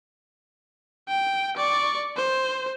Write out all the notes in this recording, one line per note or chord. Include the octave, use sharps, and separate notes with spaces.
G5
D5 C#6
C5